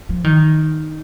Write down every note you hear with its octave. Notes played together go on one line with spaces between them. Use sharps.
F3
D#3